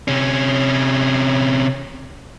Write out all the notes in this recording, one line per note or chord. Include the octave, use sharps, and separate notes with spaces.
C3 C#4